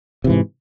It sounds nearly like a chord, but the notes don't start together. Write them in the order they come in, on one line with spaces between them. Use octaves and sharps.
C3 E3 G#2